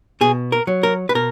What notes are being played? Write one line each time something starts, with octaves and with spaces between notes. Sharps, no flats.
B2 G#4
A#4
F#3
A#4
B4
B2 A#4